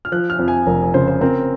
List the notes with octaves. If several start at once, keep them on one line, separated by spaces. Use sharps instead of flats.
F6
F3 F#6
F6
F2
G#5
F1 A#4
C#3 C5
C5
C4 A#4